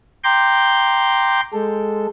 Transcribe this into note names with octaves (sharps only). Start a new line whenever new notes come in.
G5 A#5 C6 D6 G6
G#3 A4